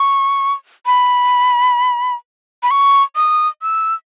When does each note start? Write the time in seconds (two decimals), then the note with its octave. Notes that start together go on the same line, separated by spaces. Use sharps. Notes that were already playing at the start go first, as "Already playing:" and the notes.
Already playing: C#6
0.86 B5
2.63 B5
2.71 C#6
3.16 D#6
3.62 E6